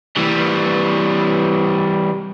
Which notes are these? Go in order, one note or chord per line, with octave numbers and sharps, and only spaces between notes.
E3 G3